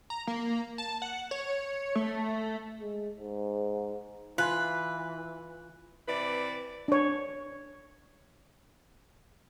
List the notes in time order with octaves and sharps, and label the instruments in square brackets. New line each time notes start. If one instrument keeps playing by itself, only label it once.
[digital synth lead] A#5
A#3
A5
F#5
C#5
A3
[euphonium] G#3
G#2
[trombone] E3 [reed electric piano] F4 G#5 C6 [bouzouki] B4
[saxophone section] C3 E3 B4 D5
[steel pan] D4 C#5